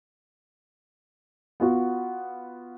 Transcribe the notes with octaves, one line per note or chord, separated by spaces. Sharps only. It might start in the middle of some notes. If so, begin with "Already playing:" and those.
B3 F4 F#4